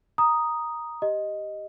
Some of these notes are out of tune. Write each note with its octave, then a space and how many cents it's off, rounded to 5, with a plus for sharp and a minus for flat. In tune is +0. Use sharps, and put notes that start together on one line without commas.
A#5 +10 D#6 +0
G4 +0 D#5 +0